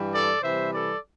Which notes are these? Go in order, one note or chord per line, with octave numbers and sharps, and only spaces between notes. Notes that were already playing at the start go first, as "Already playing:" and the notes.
Already playing: G2 E3 G3
A4 D5
C3 E3 G3 C5 E5
A4 D5